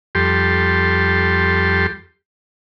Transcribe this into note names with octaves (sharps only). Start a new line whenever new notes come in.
F2 G3 G4 A4 C6